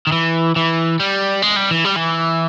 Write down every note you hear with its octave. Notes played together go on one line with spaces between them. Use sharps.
D#3
E3
E3
G3
G#3
G3
E3
G3
E3